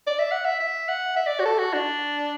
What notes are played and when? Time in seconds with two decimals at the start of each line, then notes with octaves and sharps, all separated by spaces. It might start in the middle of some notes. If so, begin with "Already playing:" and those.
0.07 D5
0.19 E5
0.31 F#5
0.45 E5
0.60 E5
0.89 F#5
1.16 E5
1.27 D5
1.40 F#4
1.46 A4
1.59 F#4
1.73 D4